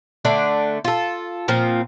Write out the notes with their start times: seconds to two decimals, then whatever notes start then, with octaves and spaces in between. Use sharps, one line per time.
0.25 D3 A3 D4 D5
0.85 F4 A4
1.48 A#2 F3 C4